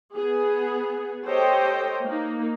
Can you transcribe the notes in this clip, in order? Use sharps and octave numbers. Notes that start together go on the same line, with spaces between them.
B3 G#4
G4 A4 C5 C#5 D#5 G5
A#3 D#4